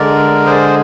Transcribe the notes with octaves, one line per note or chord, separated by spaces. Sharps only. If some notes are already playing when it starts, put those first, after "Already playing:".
Already playing: D3 G#3 A#4 D5
G#4 C5